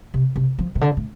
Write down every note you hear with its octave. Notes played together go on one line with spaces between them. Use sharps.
C3
C3
F3
C3
D3
A2